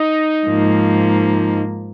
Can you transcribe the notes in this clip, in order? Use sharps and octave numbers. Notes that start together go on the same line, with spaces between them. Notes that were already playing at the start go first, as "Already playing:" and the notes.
Already playing: D#4
G#2 F3 A#3